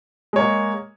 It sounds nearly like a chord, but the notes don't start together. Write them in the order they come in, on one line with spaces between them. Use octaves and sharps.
G#3 C#5 A#3